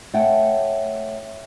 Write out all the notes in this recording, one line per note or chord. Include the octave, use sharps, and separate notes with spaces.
A3 C#5 F#5 G5